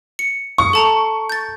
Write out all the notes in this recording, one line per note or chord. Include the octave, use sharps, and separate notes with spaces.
C#7
C#6 D#6
A4 A5 A#5
G6 A6